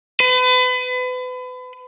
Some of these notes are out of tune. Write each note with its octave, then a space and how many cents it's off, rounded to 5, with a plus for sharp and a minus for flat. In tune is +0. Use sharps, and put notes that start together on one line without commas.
B4 +35